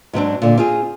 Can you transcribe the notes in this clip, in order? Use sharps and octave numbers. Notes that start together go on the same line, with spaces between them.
G#2 F#3 C4 D4
A#2 D3
C4 F4 G#4